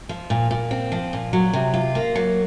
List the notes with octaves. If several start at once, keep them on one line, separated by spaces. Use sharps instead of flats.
F3
A#2
A#2
C4
F3
A#2
F#3
C3
F4
A#3
F#3